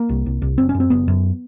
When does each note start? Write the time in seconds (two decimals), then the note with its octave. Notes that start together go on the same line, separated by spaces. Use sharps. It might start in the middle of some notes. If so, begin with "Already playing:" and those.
Already playing: A#3
0.09 C2
0.26 C2
0.42 C2
0.58 F#1 C4
0.69 C#4
0.75 F#2
0.80 C4
0.90 F#1 B3
1.08 F#2